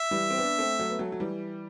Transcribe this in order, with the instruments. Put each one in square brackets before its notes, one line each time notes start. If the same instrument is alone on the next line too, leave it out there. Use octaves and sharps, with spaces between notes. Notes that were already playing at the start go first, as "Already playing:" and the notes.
Already playing: [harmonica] E5
[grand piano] E3 G3
C4
B3 D4
A3 C4
F#3 A3
B3
F#3 A3
F#3
E3 G3